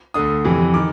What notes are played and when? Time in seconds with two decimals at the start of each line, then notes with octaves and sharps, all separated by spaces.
0.14 D2 D3 D#6
0.45 F2 C3 E3
0.74 D#3 D6